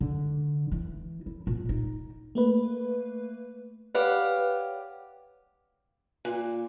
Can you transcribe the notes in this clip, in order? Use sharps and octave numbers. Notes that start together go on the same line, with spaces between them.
D3
E3
E4
A#2
D#4
A3 A#3 B4
G4 B4 C#5 D5 F5 F#5
A#2